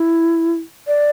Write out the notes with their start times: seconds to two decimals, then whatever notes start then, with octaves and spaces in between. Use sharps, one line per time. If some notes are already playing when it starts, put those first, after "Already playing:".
Already playing: E4
0.87 D5